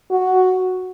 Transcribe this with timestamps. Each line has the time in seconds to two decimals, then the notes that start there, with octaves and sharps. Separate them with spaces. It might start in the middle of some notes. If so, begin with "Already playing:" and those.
0.11 F#4